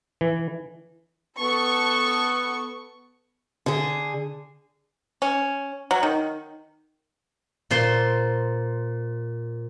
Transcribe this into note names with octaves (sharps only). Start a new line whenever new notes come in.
E3
B3 A4 C#6
D3 G#4
C#4
F#3
D#3
A#2 C5 C6